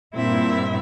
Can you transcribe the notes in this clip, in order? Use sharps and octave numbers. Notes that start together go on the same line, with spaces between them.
G2 A#2 C4 E4 E5